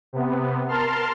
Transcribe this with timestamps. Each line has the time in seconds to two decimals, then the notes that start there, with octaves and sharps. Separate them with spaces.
0.13 C3 B3
0.68 A#4 A5 C6 F6